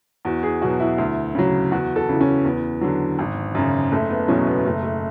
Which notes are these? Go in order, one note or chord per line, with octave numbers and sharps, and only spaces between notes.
E2 F#4
G#4
B2 F#3 F#4
E4
D2
C#3 F#3
E2 F#4
A4
C#3 E3
C#4
E2 B3
D3 F#3
G#1
F#2 C#3
F#1 A3
B3
E2 B2 F#3 C#4
B3
F#1 A3
A3